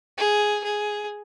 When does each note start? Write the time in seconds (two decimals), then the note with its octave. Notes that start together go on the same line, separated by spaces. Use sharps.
0.18 G#4
0.64 G#4